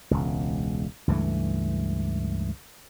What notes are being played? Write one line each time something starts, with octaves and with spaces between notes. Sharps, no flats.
E1 C#2
C#2 G2 E3 A3